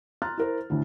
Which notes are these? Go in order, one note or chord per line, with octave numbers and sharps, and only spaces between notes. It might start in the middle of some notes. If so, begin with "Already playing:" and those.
A#5 C6 F6 F#6 A6
E4 A#4 C5
D2 A2 D3